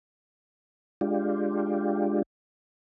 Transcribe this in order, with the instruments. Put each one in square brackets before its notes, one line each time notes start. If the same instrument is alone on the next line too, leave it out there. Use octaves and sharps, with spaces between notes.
[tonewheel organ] G#3 D4 F4 G4